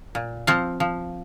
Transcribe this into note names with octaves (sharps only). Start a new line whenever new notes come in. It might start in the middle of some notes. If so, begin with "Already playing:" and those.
A#2
F3 C4 F4
F3